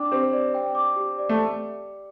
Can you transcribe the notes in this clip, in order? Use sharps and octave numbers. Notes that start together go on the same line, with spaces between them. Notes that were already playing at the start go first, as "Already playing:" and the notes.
Already playing: D4 G5 D6
C4 G4
D5
G5
D6
G4
D5
A3